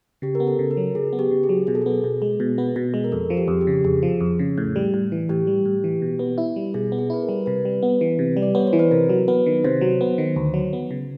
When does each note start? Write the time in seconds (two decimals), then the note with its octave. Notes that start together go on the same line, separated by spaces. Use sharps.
0.22 C#3 G4
0.35 A#4
0.40 B3
0.47 A4
0.59 C#3
0.71 A#4
0.77 F#3
0.95 C#3 G#4
1.13 B3
1.19 G4
1.31 C#3
1.43 G#4
1.49 F#3
1.67 B2 G#4
1.75 A4
1.82 B3 G#4
2.04 B2
2.22 G#3
2.40 B2
2.58 B3
2.76 B2
2.94 G#3
3.04 A#4
3.12 F2 A4
3.30 F3
3.37 G4
3.48 F2 G#4
3.61 G4
3.67 C#3
3.84 F2 G#4
4.03 F3
4.21 F2
4.39 C#3
4.58 A2
4.76 G3
4.94 A2
5.12 E3
5.29 A2 G4
5.47 G3
5.66 A2
5.84 E3
6.02 B2
6.19 B3
6.38 E4
6.56 G3
6.74 B2 G#4
6.92 B3
6.98 G#4
7.10 E4 B4
7.22 A#4
7.29 G3
7.46 C3 B4
7.65 G3
7.83 B3
8.01 E3
8.19 C3
8.37 G3
8.42 D5
8.55 B3 C#5
8.67 C5
8.73 E3
8.79 B4
8.91 C3 A#4
9.09 F#3
9.28 B3 B4
9.46 D#3
9.64 C3 C5
9.81 F#3
10.01 B3
10.18 D#3
10.36 D2
10.54 F#3
10.73 B3
10.91 C#3